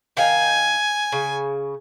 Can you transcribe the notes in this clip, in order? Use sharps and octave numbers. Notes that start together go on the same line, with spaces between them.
D#3 F5 G5 G#5
C#3